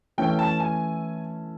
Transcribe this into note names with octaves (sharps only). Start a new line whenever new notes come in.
E3 A3 C#4 E4 A4 G5
A5
G#5